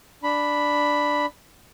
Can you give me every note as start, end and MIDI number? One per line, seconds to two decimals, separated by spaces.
0.23 1.26 62
0.23 1.26 83